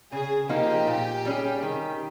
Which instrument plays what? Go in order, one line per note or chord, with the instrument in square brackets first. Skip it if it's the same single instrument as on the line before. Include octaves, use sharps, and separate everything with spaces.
[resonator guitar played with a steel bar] C#3 [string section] G#4
[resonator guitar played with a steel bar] F3 A#3 D#4 [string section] G4
[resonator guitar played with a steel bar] A#2
G3 C#4 G#4
D#3